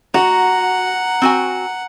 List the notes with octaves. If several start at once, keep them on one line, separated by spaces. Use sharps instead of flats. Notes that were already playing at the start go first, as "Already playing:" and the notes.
F#4 F#5 A#5
C4 F#4 G#5